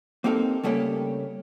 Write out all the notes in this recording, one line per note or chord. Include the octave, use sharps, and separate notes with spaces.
A#3 C4 D#4 G4 A4 A#4
C#3 G3 A3 A#3 C#4 G4